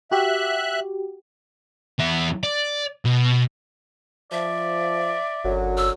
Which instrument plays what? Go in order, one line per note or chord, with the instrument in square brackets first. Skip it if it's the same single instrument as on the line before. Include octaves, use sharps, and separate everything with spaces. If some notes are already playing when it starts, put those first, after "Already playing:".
[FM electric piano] F#4 G4 [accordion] E5 F#6
[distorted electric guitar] E2 E5
D5
B2
[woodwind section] F3 [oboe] D5 [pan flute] E5
[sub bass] G1 [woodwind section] F#2 D3 F#3
[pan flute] E6